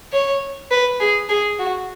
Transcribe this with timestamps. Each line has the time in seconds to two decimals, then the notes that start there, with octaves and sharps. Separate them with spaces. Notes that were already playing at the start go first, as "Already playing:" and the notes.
0.13 C#5
0.71 B4
1.00 G#4
1.29 G#4
1.59 F#4